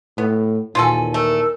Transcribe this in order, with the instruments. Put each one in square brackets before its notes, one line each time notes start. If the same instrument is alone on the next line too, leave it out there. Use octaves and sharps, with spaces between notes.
[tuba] A2 [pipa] B3
[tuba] D#2 [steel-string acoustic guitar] A#2 E3 G#5 [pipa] F4 F#4 A4
[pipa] A3 [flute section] A#4 E6